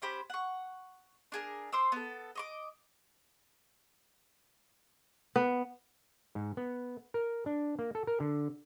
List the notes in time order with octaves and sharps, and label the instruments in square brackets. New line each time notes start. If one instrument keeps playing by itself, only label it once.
[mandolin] C#4 G4 C5 B5
F#5 C#6
D4 G#4 A#4
C5 C6 D6 E6
B3 A4
D#5 C#6 D6
[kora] B3
[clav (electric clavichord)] G#2
B3
A#4
D4
A#3
A4
A#4
D3